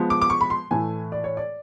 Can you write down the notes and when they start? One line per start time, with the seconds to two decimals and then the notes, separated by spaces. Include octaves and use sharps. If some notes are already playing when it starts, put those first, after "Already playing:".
Already playing: F3 G#3 B3
0.10 D6
0.21 D6
0.30 C#6
0.41 B5
0.50 C6
0.71 A2 E3 A3 G#5
1.12 D5
1.24 C#5
1.37 D5